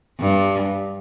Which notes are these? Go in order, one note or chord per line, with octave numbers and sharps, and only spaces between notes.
G2